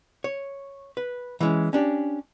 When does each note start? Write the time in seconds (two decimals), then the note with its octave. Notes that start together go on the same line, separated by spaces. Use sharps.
0.24 C#5
0.97 B4
1.40 E3 G#3 C#4
1.73 C#4 D4 G4